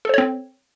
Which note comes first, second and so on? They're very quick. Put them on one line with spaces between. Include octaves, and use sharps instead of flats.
A4 C5 C#5 C4